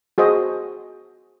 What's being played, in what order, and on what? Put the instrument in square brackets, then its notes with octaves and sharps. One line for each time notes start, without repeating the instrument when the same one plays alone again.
[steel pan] F#4 G#4 C5 D#5